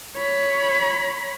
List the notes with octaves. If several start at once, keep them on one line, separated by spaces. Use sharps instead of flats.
C#5 B5